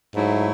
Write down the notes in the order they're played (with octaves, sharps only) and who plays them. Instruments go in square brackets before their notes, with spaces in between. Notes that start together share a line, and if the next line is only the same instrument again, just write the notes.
[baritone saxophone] G#2 [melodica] F#3 A3 E4